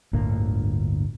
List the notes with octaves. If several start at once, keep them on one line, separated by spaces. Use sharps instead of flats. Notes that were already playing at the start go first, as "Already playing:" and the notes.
G1 D2 A2 A#3